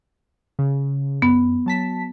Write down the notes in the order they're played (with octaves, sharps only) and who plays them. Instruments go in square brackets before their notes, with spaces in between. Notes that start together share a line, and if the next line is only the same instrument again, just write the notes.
[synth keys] C#3
[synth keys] F#2 [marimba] B3
[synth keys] F#3 A5 B6